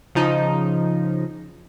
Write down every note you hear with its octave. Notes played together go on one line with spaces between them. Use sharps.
C#3 F3 D#4